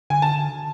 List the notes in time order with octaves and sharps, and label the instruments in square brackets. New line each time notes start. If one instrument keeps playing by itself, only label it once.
[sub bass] D3 [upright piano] G#5
[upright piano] A5